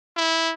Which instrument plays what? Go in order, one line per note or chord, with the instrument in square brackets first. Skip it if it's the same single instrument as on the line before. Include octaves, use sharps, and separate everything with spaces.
[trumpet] E4